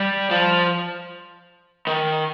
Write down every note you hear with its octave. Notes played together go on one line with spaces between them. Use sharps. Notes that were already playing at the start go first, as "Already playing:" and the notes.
Already playing: G3
F3
D#3